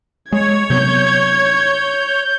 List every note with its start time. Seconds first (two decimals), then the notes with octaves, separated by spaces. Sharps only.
0.32 G#3 C#5 G#6
0.70 C3 F#3 B3 G6